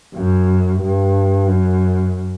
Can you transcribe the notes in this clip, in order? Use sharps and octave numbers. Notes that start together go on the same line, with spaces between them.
F#2
G2
F#2